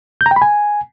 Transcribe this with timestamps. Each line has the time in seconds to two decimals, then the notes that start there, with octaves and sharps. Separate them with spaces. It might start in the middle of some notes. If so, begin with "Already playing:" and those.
0.21 G6
0.26 A#5
0.31 G5
0.36 B5
0.42 G#5